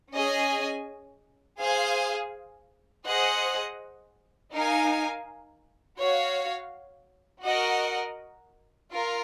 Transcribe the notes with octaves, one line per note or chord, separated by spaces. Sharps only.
C#4 G#4 D#5 G#5
G#4 C5 F5 G#5
G#4 C5 D#5 F#5
D#4 A#4 F5 G#5
F#4 C#5 F5
F#4 A#4 D#5 F#5
F4 A#4